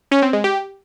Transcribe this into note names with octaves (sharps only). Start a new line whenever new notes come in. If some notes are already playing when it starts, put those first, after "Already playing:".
C#4
C4
G#3
G4